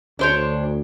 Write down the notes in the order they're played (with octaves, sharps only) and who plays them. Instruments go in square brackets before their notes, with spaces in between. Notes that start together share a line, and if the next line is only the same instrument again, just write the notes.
[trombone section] D2 [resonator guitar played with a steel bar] D4 C5 C#5